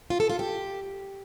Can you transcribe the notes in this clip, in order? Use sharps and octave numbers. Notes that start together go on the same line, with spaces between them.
F4
A4
F4
G4